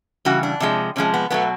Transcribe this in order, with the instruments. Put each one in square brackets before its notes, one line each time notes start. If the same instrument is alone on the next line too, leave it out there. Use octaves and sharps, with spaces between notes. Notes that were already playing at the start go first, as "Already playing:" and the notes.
[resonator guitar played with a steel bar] C#3 E3 G3 F#4
D4
C3 F3 G#3
C3 F3 G#3 C#4
B3
B2 F#3 A3 B3